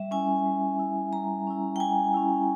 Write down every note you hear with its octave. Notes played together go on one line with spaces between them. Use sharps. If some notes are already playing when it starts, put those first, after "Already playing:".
Already playing: G3 E5
C#4 E4 G#5
G3
C#4 E4
G3 A#5
C#4 E4
G5
G3 G#5
C#4 E4